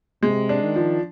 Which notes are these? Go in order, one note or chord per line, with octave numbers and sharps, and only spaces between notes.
C3 G#3
D4
D#3
F3